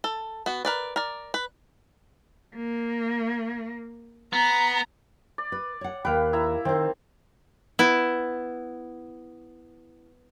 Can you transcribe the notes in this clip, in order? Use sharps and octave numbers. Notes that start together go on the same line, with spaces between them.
A4
B3 F#4
A#4 B4 D5
A#4 D5
B4
A#3
B3 A#5
D5
B4
C#5 F#5
D#2 B4 F5 G5
E4 E5 A#5
D#3 C4 C5
B3 E4